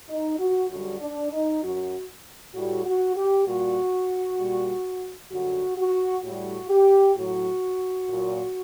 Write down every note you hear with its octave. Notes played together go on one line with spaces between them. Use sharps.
D#4
F#4
F#2 D3 G3 F#4
D4
D#4
F#2 F#3 F#4
A2 G3 F#4
F#4
G4
A#2 G3 F#4
A#2 G3
F#2 D3 G3 F#4
F#4
A2 G3 F#4
G4
A2 F#3 F#4
A#2 F#3